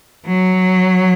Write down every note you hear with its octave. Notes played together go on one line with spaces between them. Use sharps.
F#3